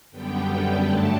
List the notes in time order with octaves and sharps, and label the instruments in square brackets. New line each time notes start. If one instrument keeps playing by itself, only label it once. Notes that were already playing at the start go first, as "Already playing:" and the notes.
[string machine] F#2 D3 G3 B3 G5
G5
G2 D3 F#3 A3 A5